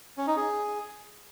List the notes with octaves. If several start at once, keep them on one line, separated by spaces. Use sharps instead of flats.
C#4
D#4
G#4